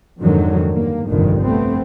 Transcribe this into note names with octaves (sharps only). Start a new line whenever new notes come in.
F2 G#2 D3 D#3 F#3
G2 A#3
F1 A#1 G2 A#2 D3 D#3
A3 B3 C4